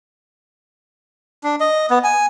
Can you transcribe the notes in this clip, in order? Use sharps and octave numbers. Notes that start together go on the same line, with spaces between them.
D4
D#5
B3
G#5